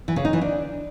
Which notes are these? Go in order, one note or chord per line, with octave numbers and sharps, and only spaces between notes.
E3
C#3
D#4
E3
D4